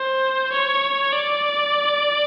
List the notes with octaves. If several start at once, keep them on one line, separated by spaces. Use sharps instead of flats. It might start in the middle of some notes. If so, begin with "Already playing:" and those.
Already playing: C5
C#5
D5